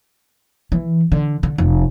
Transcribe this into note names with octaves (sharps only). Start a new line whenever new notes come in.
E3
D3
D3
F1